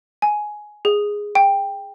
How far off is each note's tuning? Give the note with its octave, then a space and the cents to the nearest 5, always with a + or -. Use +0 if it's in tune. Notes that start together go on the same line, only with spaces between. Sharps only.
G#5 +10
G#4 -5
G5 +10